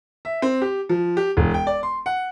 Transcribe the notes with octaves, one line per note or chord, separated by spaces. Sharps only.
E5
C4
G4
F3
G4
E1
G5
D5
C6
F#5